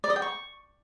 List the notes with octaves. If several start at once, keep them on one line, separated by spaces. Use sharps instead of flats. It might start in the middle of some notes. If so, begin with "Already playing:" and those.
D5
D#5
G5
C#6